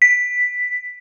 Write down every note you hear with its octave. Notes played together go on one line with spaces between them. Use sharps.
B6